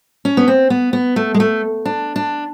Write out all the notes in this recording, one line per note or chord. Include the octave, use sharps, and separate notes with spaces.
C#4
B3
C4
B3
B3
A3
G#3
A3
D4
D4